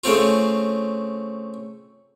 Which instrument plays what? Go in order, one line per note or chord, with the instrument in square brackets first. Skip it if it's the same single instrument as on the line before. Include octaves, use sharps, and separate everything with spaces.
[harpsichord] C#3 A3 C4 F4